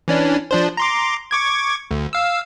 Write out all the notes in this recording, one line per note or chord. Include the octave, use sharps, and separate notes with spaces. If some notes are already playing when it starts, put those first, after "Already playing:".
E3 C#4 D4
F3 D4 C5
A#5 C6 D6
C#6 D6 G#6
D2
F5 E6